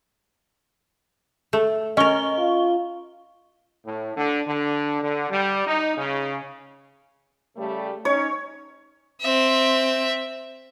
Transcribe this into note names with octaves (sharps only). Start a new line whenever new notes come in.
A3
C#4 A#4 D#5 C#6 G7
F4
A2
D3
D3
D3
G3
D#4
C#3
C#3 G3 A3
C#4 D#4 C#5
C4 E5